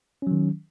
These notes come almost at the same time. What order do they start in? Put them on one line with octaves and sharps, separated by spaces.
C#4 F#3 D#3